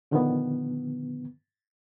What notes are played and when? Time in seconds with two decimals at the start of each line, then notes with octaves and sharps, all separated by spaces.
0.11 A#2 D3 D#3 F3 A#3 B3